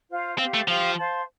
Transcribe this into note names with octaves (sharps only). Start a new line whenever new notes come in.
F4 C5 F5
C4 G4 C5 F5
A3
F3 G4 C5 F5
C5 F5 A5 C6